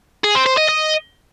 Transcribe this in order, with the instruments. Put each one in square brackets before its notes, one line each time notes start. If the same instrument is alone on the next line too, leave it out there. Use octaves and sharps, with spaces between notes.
[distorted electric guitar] G#4
C4
C5
D#5
D#5